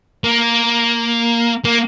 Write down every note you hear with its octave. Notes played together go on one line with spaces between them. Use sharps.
A#3
A#3